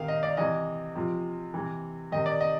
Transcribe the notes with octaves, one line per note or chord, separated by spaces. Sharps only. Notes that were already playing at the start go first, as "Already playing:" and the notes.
Already playing: C3 D#3 F5
D#5
D5
C3 E3 D#5
C3 F3
C3 E3
C3 D#3 D#5
D5
D#5